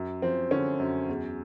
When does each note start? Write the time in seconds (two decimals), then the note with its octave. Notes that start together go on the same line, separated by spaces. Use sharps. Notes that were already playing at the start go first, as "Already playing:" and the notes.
Already playing: F#2
0.22 F3 C4
0.51 D3 C#4
0.80 F#2
1.09 E2